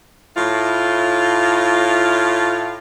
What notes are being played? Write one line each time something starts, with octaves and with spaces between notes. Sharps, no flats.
A2 E4 F4